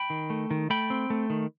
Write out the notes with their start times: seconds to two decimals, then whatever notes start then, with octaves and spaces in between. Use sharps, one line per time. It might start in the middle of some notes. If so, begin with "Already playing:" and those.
Already playing: G5 B5
0.10 D#3
0.30 A3
0.51 D#3
0.70 A3 G5 B5
0.90 C4
1.10 A3
1.30 D#3